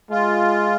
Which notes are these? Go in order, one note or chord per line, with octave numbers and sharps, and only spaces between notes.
G#3 F4